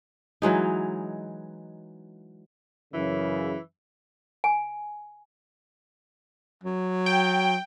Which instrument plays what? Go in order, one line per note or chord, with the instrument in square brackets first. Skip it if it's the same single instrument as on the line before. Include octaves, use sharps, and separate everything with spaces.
[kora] E3 F#3 G#3 D#4
[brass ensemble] F#2 C#3 [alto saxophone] E3
[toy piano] G#5
[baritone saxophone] F#3
[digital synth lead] G5